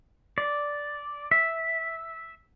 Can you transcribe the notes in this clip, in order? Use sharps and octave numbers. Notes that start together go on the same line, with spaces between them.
D5
E5